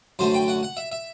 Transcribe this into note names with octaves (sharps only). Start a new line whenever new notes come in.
F#2 D3 A3 C5
G5
F#5
F#5
E5
E5